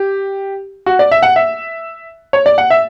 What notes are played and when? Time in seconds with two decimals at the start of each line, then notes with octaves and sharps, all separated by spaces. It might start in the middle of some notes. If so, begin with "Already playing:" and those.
Already playing: G4
0.86 F#4
0.99 D5
1.11 E5
1.23 F#5
1.36 E5
2.33 C#5
2.46 D5
2.58 F#5
2.70 E5